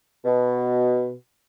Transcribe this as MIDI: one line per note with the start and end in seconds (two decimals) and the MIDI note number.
0.25 1.13 47